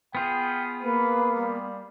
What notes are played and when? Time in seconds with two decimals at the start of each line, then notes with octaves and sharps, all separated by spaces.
0.15 B3 F4 G#4 G5
0.83 A#3 B4
1.37 G3